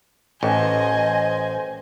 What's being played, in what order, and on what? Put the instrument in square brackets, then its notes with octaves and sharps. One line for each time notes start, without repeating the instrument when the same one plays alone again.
[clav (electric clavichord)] A1 [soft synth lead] C5 [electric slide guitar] D#5 [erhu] G#5